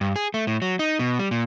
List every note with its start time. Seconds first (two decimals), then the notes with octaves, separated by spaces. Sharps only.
0.01 G2
0.16 G#4
0.34 A3
0.47 A2
0.62 F#3
0.79 D#4
0.99 B2
1.19 G3
1.31 A#2